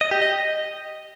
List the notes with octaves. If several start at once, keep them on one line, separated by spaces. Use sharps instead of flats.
D#5
G4
D#5